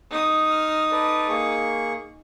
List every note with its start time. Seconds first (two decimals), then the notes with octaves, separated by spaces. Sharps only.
0.10 D#4 D#6
0.50 F6
0.92 A4 B4 D5
1.28 A#3 G#4 C#6